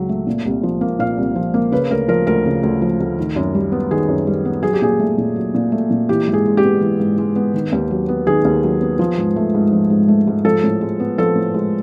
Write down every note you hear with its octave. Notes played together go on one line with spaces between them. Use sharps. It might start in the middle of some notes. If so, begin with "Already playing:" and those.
Already playing: C#2 C#3 F#3
A3
A#2
C2
F3
A#3
A#2 F5
C2
F3
A#3
C#3 B4
D2 A#4
F3 A#4
D2 A#4
C#3
D2
F3
D2
D#3
F#2
G3
B3
D#3 G#4
F#2
G3
B3
F#3 G#4
G4
A#2 G#4
A3
A#2
F#3
A#2
A3
A#2
E3 G4
G#2
G#4
G#3
G4
B3
E3
G#2
G#3
B3
D#3
D#2
F#3
B3
D#3 G#4
D#2
F#3
B3
F3
G#2
A3
G#2
F3
G#2
A3
G#2
F3 A4
A2
G#3
B3
F3 A4
A2
G#3